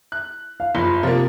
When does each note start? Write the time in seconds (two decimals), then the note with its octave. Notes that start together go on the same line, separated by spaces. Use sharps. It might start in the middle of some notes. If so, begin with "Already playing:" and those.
0.12 F#6
0.60 F5
0.75 F#1 F3 B5 G7
1.03 C3 F3 A#3